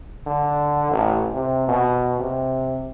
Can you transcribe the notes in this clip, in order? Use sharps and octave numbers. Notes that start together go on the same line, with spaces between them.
D3
A1
C3
B2
C3